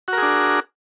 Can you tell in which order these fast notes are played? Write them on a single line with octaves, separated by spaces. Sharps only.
F#4 A#4 G#4 D4